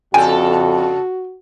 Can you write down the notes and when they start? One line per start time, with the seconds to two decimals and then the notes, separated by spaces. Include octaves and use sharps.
0.14 F2 C#3 F#4 A4 G5 G#5